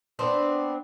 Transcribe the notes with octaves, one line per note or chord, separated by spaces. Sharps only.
B3 C4 D4